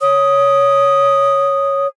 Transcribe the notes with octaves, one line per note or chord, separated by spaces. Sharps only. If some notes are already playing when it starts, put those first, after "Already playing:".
C#5 D#6